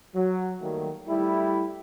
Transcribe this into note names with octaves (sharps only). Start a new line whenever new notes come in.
F#3
D#3 F#3 G3 A3 A#3
G3 A3 E4